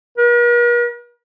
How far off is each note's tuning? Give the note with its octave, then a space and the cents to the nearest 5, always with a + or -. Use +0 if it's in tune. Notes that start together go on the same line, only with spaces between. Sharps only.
A#4 +45